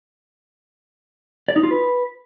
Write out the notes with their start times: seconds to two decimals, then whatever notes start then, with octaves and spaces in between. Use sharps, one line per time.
1.48 D5
1.56 D#4
1.63 F4
1.71 B4